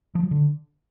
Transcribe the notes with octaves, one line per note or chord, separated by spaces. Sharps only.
F3
F#3
D3